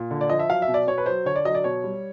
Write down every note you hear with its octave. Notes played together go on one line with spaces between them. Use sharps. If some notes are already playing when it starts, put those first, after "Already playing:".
Already playing: A#2
D3
D5
F3 D#5
E5
F#3 F5
E5
B2
D5
B2 C#5
B4
F#3 C5
D3 C#5
D5
F#3 D#5
D5
B2 C#5
G3